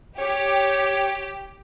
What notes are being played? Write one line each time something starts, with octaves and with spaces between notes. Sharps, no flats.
G4 C#5